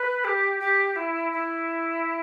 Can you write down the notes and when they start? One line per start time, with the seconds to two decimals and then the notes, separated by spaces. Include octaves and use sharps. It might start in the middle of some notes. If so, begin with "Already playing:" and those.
Already playing: B4
0.24 G4
0.59 G4
0.95 E4
1.32 E4